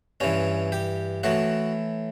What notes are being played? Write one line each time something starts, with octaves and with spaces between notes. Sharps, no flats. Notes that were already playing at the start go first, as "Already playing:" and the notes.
G2 E3 C#4
G4
A2 E3 F#4